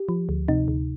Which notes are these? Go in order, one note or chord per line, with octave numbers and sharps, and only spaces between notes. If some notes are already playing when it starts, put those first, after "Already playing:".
Already playing: G4
F3
D2
C3 D#4
D2